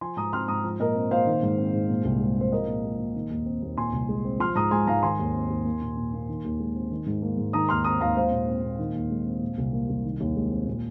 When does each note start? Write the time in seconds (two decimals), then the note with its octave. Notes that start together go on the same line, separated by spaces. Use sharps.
0.01 F3 G#5 C6
0.17 G#2 A#5 D#6
0.33 C4 C6 F6
0.48 G#2 A#5 D#6
0.64 F3
0.80 A#2 A#4 D#5
0.95 C4
1.11 A#2 C5 F5
1.27 D#3
1.43 G#2
1.57 C4
1.73 G#2
1.89 A#2
2.05 C2
2.20 G#3
2.37 C4 C5
2.52 F3 A#4 D#5
2.68 A#2
2.84 G#3
2.99 A#2
3.15 D#3
3.30 D#2
3.46 C4
3.62 D#2
3.77 A#2 G#5 C6
3.93 C2
4.09 G#3
4.24 C4
4.40 F3 C6 F6
4.55 G#2 A#5 D#6
4.71 G#3 G#5 C6
4.87 G#2 F5 A#5
5.03 D#3 G#5 C6
5.19 D#2
5.34 C4
5.50 D#2
5.65 A#3
5.81 A#2
5.97 A#2
6.13 A#3
6.29 D#3
6.44 D#2
6.60 G#3
6.75 C4
6.91 D#3
7.06 G#2
7.22 A#3
7.37 G#2
7.53 D#3 A#5 D#6
7.69 D#2 C6 F6
7.84 C4 A#5 D#6
8.01 D#2 F5 A#5
8.17 G#3 C5 F5
8.31 A#2
8.48 C4
8.64 A#2
8.79 D#3
8.95 D#2
9.10 G#3
9.26 C4
9.41 A#2
9.58 C2
9.73 A#3
9.89 C2
10.04 D#3
10.20 D#2
10.36 G#3
10.51 C4
10.67 A#2